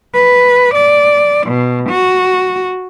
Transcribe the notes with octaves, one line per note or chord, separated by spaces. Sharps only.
B4
D5
B2
F#4